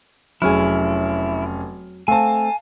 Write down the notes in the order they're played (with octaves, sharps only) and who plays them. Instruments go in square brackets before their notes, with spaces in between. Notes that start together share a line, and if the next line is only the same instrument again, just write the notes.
[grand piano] F1 C#4 F6 [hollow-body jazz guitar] F#3 G#4 [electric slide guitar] E4
[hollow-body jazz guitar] A3 C4 [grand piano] F5 A5 [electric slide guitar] G#5